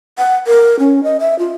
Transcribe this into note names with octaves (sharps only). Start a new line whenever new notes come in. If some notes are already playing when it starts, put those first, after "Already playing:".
F#5
A#4
C#4
D#5
E5
F4